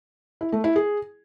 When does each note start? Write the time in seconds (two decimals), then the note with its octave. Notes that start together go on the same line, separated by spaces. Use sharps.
0.41 E4
0.52 A3
0.64 E4
0.76 G#4